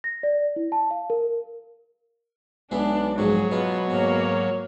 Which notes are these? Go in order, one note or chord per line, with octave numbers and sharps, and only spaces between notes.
A#6
D5
E4
A5
F5
A#4
B1 E3 G#3 B3 D4
F2 G#2 F#3 G#4
B2 B3 F4
G#2 A#3 C#5